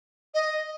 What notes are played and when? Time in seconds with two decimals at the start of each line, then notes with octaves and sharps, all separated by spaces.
0.34 D#5